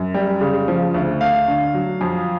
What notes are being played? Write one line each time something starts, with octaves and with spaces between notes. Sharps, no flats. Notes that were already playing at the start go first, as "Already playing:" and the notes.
Already playing: F#2
G3
C#3
F3
D2
A3 F5
D3
F#3
F2